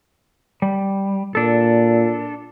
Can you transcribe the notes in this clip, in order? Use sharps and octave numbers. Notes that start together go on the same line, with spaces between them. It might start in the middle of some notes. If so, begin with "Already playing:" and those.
G3
A#2 D4 A4